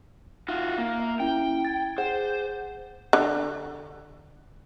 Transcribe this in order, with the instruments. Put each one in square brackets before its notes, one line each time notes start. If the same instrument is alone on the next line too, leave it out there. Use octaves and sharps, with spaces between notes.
[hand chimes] D#4 E5 [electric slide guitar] F4 F#4
[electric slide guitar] A#3
[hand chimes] E5
[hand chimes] C#4 E4 [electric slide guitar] G5
[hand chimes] G#6 A6
[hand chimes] G#4 F#5 [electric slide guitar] C5
[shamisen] D3